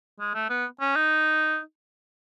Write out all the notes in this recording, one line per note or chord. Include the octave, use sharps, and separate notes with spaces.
G#3
A3
B3
C#4
D#4